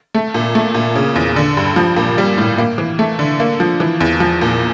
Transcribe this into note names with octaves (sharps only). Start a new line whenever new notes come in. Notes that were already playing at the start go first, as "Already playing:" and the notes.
A3
A#2
A3
A#2
C#3
E2
D3
G2
F3
A#2
G3
A2
A#3
E3
A3
D3
A#3
F3
E3
E2
F3
A#2